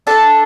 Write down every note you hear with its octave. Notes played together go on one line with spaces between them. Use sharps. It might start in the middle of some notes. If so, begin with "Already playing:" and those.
D4 A4 A5